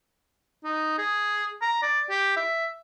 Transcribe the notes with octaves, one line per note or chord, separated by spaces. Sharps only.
D#4
G#4
A#5
D5
G4
E5